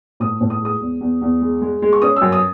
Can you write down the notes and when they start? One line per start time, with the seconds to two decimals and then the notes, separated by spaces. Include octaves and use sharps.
0.20 A2 D#6
0.41 A2
0.50 D#6
0.61 G#3 D#6
0.81 E2
1.01 E2
1.22 E2
1.41 G#3
1.62 G#3
1.82 G#3
1.93 C#6
2.02 C#4 D#6
2.16 E6
2.22 F#2
2.32 D#6